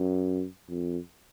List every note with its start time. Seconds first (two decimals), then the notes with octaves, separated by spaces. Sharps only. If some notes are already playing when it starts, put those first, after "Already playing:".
Already playing: F#2
0.69 F2